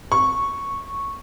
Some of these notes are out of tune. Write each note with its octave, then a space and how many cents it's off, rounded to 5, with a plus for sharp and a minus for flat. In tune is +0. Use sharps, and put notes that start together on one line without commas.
C#6 -5